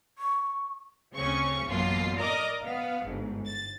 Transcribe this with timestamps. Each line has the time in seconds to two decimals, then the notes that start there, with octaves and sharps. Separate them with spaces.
0.18 C#6
1.16 D2 C#3 C4 C#4 C#6
1.66 A1 F#2 B2 A#3 F4 C7
2.17 A#4 D5 D#5 A#5 D6 F6
2.61 B3 F5
3.04 G1 G#2
3.46 A6